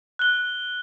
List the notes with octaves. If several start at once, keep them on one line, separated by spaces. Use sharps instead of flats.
F#6 G7